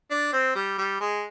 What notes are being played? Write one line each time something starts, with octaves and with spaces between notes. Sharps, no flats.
D4
C4
G3
G3
G#3